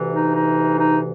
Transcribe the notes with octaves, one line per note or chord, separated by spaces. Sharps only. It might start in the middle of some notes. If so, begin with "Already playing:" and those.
Already playing: D2 C3 E3
D#4
D#4
D#4